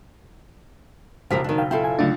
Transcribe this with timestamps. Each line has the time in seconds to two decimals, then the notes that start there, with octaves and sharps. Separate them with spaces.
1.31 F#1 B1 F3 G4 A#4 B6
1.44 D#3 D4
1.58 F5 G5
1.71 E4 F4 A4 G5
1.84 G#5
1.99 C#2 D3 F#3 A3 D4 A6